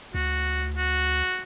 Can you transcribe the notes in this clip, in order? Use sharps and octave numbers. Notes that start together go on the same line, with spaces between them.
D2 F#4
F#4